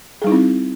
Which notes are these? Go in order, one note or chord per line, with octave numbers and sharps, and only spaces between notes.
G3 C4 D#4 E4 G#4